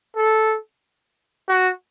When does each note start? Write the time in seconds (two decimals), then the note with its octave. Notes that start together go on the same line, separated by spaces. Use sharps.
0.17 A4
1.49 F#4